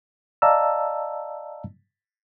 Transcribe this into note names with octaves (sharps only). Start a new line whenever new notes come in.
D5 D#5 F5 A5 A#5 E6